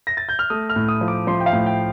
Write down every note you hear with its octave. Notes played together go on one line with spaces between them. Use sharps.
A#6
A6
G6
F6
A3 D#6
F6
A2
D#6
F3
D6
F3 C6
G5
F5
A2
G5